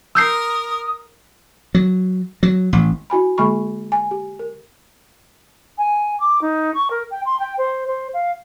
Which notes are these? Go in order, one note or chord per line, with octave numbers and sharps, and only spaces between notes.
A#4 D#6 E6 G6 C7
F#3
F#3
A1
E4 F#4 G#5 B5
D3 G#3 A#3 G#5 B5 C#6
G#5
G4
A#4
G#5
D6
D#4
C#6
A#4
G5
C6
G5
C5
C5
F5